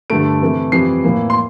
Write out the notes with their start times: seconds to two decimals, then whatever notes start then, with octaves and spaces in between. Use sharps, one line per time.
0.10 G2 D3 A3 D7
0.41 C3 E3 A3
0.72 F2 E3 G3 C7
1.03 A2 E3 A#3
1.30 C6